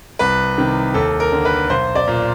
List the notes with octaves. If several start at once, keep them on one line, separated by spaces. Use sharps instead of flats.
C2 B4
C3 D#3
D#2 A4
A#4
D3
B4
B1 C5
D5
A#2